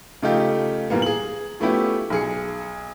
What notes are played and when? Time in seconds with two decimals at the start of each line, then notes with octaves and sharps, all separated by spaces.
0.22 C#3 F3 A3 D#4 F4 G4
0.90 A#2 E3 G3 A#3 B3
1.02 G#4 F#7
1.60 F3 A3 B3 C#4 E4 G4
2.10 B1 G#4 C#7